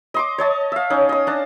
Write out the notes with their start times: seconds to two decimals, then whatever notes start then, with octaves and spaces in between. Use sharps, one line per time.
0.14 D#5 C6 D6
0.38 C#5 D#5 A5
0.72 E5 F5
0.90 C#4 D#4
1.09 D#5 D#6
1.27 D4 A5